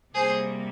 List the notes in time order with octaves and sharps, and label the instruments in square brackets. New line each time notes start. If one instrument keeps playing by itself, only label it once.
[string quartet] C3 G3 A#3 G#4 C5